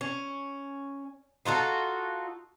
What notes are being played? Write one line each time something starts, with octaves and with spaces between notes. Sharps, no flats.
C#4
D#4 F4 F#4 A4